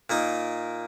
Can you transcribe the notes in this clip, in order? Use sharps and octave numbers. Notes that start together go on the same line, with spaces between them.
A#2 A#3 D#4